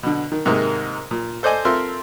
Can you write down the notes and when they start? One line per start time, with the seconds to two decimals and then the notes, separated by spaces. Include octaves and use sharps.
0.03 B2 D3
0.32 D#3
0.46 G#2 C3 D#3 G#3 A#3
1.11 A#2
1.43 A4 C5 D5 D#5 G#5
1.65 C4 F4 A4 A#4 E5 C6